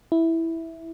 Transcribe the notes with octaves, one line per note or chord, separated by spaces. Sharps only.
E4